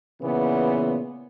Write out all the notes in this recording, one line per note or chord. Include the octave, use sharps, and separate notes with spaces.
A#2 C#3 E3 B3